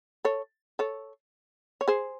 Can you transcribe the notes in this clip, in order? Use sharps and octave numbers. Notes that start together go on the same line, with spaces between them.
A4 C#5
A4 C#5
C#5
G#4 C5